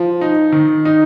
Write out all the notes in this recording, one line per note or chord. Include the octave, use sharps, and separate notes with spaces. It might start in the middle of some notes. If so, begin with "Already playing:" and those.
Already playing: F3
D#4
D#3
D#4